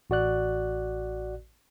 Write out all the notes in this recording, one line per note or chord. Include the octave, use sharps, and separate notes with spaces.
A1 F#4 D5 F#6